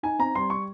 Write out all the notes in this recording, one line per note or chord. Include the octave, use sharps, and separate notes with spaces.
D#4 G#5
C4 A#5
G3 C6
C#6